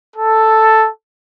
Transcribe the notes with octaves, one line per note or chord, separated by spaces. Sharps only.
A4